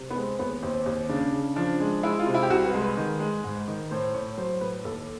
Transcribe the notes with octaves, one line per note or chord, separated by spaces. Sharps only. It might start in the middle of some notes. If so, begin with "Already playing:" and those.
Already playing: C3
B3
G#3 C4
D#2 B3
D#2 C4
D#2
C#3 D4
C#3
F3 D4
G#3
G#3 E4
F4
C3
E4
G4
C2 F#4
B4
G#3
B4
D#3
G#3
G#2
D#3
A2 C5
A2 C#5
F#3 C5
A2 B4
D#2 A4